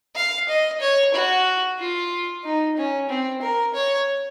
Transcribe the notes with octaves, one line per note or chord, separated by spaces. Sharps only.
F5
D#5
C#5
F#4
F4
D#4
C#4
C4
A#4
C#5